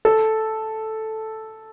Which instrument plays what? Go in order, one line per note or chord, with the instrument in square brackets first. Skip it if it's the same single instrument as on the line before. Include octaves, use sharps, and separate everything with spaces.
[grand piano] A4